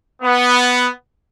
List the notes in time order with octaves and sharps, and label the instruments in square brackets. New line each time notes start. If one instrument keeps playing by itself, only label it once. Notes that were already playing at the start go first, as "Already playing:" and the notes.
[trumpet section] B3